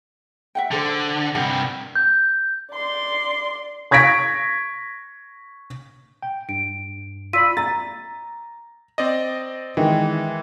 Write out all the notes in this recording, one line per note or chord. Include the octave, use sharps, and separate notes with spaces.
E5 F#5 G5
D3 D4 A4 C5
G2 C3 A#4 F#5
G6
D5 C6
C#6 G#6 A#6 B6 D7
G5
G2 D7
F4 D5 B5 E6 B6 D#7
A#5 A6
C4 D5 D#5
D#3 E3 G#3